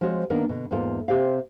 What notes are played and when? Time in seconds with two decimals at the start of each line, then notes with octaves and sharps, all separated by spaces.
0.01 F3 G#3 C4 F#4 C#5
0.30 D#3 A#3 B3 D4 A#4 D5
0.49 B2 D3
0.71 E2 G#2 A#3 B3 F4 A4
1.08 C3 C4 G4 C5 F5